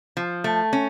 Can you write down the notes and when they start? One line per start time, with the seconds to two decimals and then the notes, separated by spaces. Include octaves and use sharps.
0.17 F3
0.44 A3
0.73 C#4